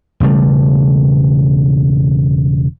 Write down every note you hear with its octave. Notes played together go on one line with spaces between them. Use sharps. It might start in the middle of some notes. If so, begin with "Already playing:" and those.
E1 C#3 G3 A3